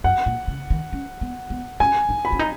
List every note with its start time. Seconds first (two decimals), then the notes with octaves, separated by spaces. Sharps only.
0.04 F#2 F#5
0.26 A#2
0.48 C#3
0.70 D#3
0.93 C#4
1.21 B3
1.50 B3
1.80 C#4 G#5
2.09 D#4
2.25 B5
2.32 C#4
2.39 D#4